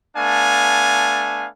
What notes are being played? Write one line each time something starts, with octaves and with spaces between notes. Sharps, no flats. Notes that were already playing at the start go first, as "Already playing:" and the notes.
A3 B3 D4 F5 G#5